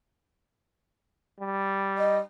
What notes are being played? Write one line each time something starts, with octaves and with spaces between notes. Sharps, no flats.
G3
D#5